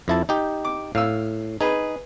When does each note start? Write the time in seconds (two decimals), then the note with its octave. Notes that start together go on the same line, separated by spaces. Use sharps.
0.08 F2 E4 A5
0.29 D#4 G4
0.65 D6
0.95 A2 F5 E6
1.61 D#4 G#4 B4